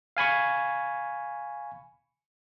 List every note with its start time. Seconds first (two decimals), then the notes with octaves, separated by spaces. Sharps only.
0.17 F5 G#5 B5 C#6